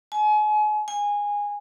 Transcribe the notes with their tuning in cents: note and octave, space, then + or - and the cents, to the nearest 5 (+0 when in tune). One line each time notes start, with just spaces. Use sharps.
G#5 +35
G#5 -15